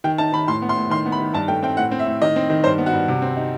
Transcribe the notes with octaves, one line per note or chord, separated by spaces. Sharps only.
D#3 G5
D#4 A5
D#3 B5
A2 C6
B3
C6
A2
D#3 C6
B3
B5
D#3
G2 A5
A3 G5
C4 G5
A2 F#5
C4
E5
A2
D#3 D#5
C4
D#3
G2 C5
B3
F#4
G2
C3
C4
D#4